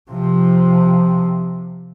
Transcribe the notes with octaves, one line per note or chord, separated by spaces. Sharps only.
C3 F3